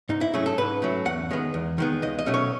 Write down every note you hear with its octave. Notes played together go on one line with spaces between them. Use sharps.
G#2 D#4
E4
F#3 A3 C#4 G#4
A4
G#2 B4
F#3 A3 C#4
E2 F#5
D#3 G#3 B3
E2
D#3 G#3 B3
C#2 D#5
D#5
B2 F#3 A3 C#4
C#5